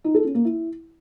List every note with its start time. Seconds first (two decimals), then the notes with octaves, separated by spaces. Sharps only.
0.04 D#4
0.14 A4
0.24 C#4
0.35 A#3
0.45 E4